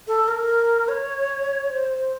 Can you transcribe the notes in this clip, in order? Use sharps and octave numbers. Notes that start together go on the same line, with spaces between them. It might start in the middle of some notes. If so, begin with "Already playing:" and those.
A4
A#4
C#5
C5